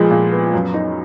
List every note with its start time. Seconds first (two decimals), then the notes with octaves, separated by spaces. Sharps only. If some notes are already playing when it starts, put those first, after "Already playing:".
Already playing: A#2 F3 G#3 B3
0.11 A#2
0.32 B3
0.54 F#2
0.74 D#4